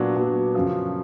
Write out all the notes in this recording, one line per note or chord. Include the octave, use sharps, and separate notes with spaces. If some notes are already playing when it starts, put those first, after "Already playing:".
Already playing: A#2 F#3 B3 D4 F#4
A#2 F#3 B3 D4 F#4
F#2 C#3 F3